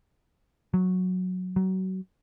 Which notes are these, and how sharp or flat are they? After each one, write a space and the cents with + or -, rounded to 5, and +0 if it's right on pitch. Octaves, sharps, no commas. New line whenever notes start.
F#3 -10
F#3 +25